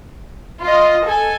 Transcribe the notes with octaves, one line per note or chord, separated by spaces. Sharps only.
F4 D#5
A4 G#5